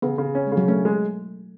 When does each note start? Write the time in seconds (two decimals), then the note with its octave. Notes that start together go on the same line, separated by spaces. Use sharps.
0.02 C#3 B3
0.18 C#3
0.35 C#4
0.47 G#3
0.52 C#3
0.57 F#3
0.68 A3 C#4
0.85 G#3